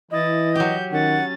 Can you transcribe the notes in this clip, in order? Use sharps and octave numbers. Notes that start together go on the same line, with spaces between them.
E3 E4 D#5 A6
F#3 G4 G6
D#3 C#4 F#5 A6